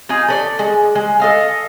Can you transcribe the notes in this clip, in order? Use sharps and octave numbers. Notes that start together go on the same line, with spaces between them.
D#4 F4 G#4
A4 B4 D5
G#3
G#3
A4 D#5 F5